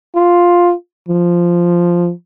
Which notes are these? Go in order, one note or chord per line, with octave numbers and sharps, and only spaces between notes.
F4
F3